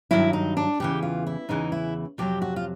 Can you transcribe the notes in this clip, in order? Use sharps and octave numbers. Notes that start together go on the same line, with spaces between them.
G2 D#3 F#3 E4
D#4
D4
E2 C#3 E3 G4
F4
E4
E2 C#3 E3 D#4
E4
F2 C3 D#3 F#3 G4
F#4
F4